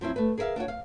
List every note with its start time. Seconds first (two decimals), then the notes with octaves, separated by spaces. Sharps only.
0.01 F3 F#3 C4 E4
0.16 A3 B4
0.38 G#4 A#4 B4 E5 F5
0.56 D4 F4 F#4 C#5
0.68 F5